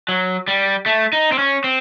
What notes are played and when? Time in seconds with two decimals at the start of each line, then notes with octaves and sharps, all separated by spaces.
0.09 F#3
0.48 G3
0.86 A3
1.13 D#4
1.32 C4
1.38 C#4
1.64 C4